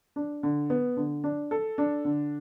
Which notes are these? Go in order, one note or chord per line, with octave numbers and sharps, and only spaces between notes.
D4
D3
B3
D3
D4
A4
D4
D3